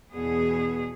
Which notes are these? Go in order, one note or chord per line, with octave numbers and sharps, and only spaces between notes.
E2 B2 B3 G#4